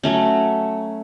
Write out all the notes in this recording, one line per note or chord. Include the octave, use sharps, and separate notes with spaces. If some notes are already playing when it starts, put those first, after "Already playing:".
F#3 A3 C#4